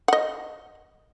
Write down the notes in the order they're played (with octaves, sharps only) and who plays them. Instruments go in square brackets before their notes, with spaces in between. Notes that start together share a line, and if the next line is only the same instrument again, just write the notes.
[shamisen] D#5 F#5